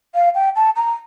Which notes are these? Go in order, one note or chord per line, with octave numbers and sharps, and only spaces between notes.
F5
G5
A5
A#5